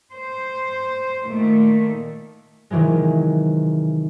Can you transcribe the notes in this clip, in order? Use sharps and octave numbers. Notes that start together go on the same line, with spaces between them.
C5
A#2 D#3 A3
C3 D#3 E3 F#3 G#3